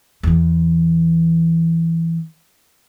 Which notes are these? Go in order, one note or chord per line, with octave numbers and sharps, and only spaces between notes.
E2 E3